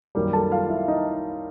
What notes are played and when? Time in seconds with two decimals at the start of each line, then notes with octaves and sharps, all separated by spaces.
0.15 F#2 D#3 G3 A#3
0.33 A4 A5
0.51 F4 F5
0.69 E4 E5
0.88 D#4 D#5